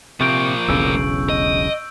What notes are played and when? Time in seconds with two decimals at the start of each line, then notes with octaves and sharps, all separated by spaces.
0.21 C3 F3 A#3 C#6 G6 D7
0.68 E1 B1 C#3 E6
1.29 D#5